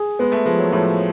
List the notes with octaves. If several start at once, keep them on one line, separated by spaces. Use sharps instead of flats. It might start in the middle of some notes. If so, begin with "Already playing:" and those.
Already playing: G#4
G#3 B3
A3
F3 G#3
F#3
A2 F3